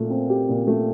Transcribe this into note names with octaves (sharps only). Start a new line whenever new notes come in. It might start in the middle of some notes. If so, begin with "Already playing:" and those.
Already playing: A#2 A3
C4
G4
A#2
A3